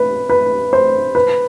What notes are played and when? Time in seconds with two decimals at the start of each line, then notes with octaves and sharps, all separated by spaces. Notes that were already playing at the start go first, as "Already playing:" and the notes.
Already playing: B4
0.30 B4
0.73 C5
1.15 B4